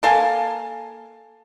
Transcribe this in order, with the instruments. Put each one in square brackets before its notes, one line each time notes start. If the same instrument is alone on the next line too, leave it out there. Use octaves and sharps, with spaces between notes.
[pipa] A#3 A4 F5 G#5